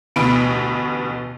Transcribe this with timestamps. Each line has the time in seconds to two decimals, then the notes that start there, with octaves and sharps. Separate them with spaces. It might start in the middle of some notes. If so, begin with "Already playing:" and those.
0.16 A1 D2 B2 B3 B5 D7